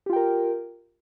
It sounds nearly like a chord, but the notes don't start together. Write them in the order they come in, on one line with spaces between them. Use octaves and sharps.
G4 F4 G5 A#4